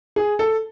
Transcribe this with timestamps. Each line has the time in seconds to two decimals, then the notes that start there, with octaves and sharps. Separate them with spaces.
0.16 G#4
0.39 A4